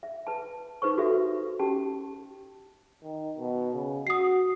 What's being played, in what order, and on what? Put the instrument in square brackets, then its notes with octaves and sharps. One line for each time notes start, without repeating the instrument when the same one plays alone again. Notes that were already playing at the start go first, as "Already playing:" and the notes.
[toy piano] E5
B4 A5
D#4 B4 C5 C#6
F#4 G4 A4 B4 C5 E5
C#4 G4 A5
[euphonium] D#3
B2
C#3
[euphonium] F#4 [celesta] D#6 C7